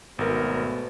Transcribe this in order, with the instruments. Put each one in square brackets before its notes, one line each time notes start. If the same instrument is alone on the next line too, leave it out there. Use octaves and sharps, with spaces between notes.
[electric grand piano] G#1 A#4 [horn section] B2 A3 B3